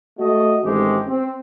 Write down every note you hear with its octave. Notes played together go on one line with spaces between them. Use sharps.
A3 F#4 D#5
A1 D#3 G#3 A3 C4 G4
C4